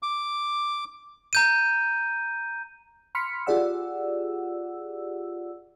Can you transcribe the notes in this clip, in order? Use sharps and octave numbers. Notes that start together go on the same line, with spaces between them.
D6
A#5 G6 D#7
B5 C6 F6 B6 C#7
F4 G4 G#4 D5 F#5 E6